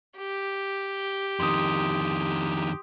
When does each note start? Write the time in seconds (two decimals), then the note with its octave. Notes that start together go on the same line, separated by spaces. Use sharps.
0.17 G4
1.40 F2 D#3 C6 D#6